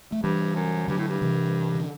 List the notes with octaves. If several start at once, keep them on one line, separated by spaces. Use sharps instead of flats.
A3
G2 E3 G3
F#2
G2 D3 F#3
A2
G2
C3 E3
D3